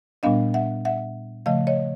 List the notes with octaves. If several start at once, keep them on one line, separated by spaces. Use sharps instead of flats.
A#2 G3 B3 D4 D#5 F5
E5 F#5
E5 F#5
C#3 F3 A3 D#5 F5
C#5 D#5